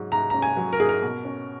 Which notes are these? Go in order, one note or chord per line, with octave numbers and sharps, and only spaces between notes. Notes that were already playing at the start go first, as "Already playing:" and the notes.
Already playing: G#2 F#3 C#4
G#2 A#5
C#4 A#5
G#5
F#3
A#4
G#2 G#4
A#4
B2
C#4